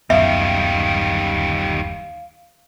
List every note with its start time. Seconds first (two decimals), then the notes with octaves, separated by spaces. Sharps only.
0.10 D1 F#2 D#3 G3 B3 E5 F5